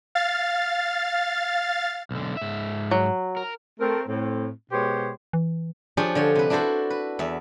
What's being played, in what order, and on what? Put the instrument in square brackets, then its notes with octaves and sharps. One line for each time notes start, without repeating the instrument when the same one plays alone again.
[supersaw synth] F5 A6
[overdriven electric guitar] B1 D3
G#2 E5
[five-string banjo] F#3
[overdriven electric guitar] A#4
[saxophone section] A3 C4 A#4
A2 C4
B2 G#3 B3 G4 C5 C#5
[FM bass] E3
[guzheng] F3 D4 F4 G4 G#4 C#5
D3 F3 C#5
C3 B4
D4 E4 F#4 A4 C5
B4
E2 E5